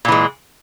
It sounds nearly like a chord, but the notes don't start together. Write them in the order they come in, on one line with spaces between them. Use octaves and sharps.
A#2 E3 G#3